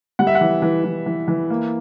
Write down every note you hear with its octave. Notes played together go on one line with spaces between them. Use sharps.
G3 F#5
E5
F#5
E3
E3
E3
E3
E3
A#3